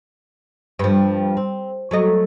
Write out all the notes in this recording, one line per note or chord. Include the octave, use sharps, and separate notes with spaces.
G2 F3
C4
F#3 A3 D#5